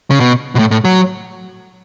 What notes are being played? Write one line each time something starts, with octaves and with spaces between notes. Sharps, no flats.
C#3
B2
B2
A2
A2
F#3